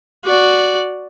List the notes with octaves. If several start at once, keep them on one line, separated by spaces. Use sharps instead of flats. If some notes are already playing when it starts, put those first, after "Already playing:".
F#4 D5